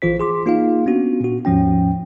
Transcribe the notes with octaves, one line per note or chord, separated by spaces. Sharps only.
A#1 E3 F4 C5 B6
G#4 C6 D6
A#3 D#4 F4 G#4 F5
B3 C#4 D4 F#4
A#2 F#4
D#2 G#2 F3 C#4 G5